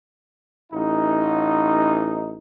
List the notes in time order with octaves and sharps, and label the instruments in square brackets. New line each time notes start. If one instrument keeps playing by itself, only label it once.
[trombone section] A1 D#4